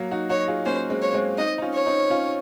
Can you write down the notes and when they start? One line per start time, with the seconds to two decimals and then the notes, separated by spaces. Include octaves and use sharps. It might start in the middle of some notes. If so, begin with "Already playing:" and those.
Already playing: F#3 A#3
0.11 D#4 F#4
0.29 D#4 F#4 C#5
0.47 F4 G#4
0.66 A#3 C#4 C5
0.90 G#3 C4
1.02 C#5
1.14 G#3 C4
1.38 C4 D#4 D#5
1.58 D#4
1.62 C#4 F4
1.74 C#5
1.86 C4 D#4
2.10 C#4 F4